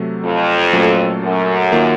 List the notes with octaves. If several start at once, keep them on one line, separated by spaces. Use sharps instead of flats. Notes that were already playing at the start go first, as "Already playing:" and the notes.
Already playing: C3 F#3 A3
F2
A#2 F#3 A3 C#4 A4
F#2
D#3 A#3 F4